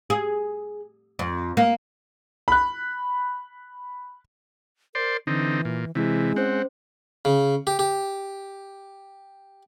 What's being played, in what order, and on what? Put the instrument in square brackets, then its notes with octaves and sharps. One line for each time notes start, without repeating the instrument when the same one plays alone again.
[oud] G#4
F2
A#3
[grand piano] B5 F#6
[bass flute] A#4 [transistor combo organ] C5 D5 C6
[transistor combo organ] D3 C4 D#4 [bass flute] E3
[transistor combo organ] A#2
[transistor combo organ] C3 E3 [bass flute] G#3 [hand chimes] C4 E4
[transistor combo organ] C4 F#5 [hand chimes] C#4 C5
[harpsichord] C#3
G4
G4